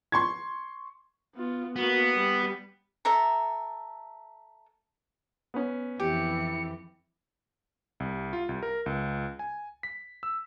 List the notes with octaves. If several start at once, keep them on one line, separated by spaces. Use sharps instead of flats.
C6 C#6 G#6
B3 F4
A#3 B3 F#4
G3
A4 E5 A#5
B3 C#4
F2 E3 E4 G4 C#7
C2
F4
C2
A#4
C#2
G#5
B6
E6